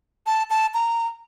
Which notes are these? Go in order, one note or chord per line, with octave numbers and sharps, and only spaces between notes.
A5
A5
A#5